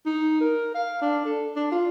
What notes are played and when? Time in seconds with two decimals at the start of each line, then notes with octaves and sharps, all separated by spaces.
0.06 D#4
0.41 A#4
0.75 F5
1.02 D4
1.26 A4
1.56 D4
1.72 F4